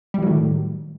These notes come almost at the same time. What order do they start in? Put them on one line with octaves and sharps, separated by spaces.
G3 E3 F#3 A2 D#3